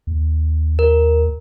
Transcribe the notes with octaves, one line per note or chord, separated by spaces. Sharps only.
D#2
A#4